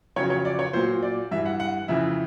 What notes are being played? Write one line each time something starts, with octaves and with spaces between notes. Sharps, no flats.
F2 C#3 F#3 C#5
C#5
D5
C#5
A#2 F#3 C5
D5
G2 E3 E5
F#5
F#5
F2 C#3 E3 E5